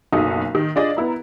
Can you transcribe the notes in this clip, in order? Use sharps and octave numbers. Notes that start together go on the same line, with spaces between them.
F#1 B1 D#4 F#4 A4 D#6
D#3
D4 F4 G#4 D5 D#5
B3 E4 A#4